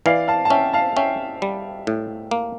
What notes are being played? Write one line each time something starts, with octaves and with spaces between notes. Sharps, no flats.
E3 D5 F5
F5 A5
A5
C#4 E5 G5
F5 A5
C#4 E5 G5
G3
A2
A#3